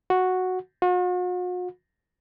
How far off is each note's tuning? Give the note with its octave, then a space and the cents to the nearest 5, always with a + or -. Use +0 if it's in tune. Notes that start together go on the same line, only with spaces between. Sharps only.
F#4 -5
F#4 -45